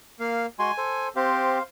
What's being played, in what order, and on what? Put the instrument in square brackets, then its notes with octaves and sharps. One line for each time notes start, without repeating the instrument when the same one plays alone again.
[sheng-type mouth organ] A#3 F5
[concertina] G#3 F#4 C6 [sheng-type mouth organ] G#5
[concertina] A4 C5
[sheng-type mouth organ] C4 G4 [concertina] C5 F5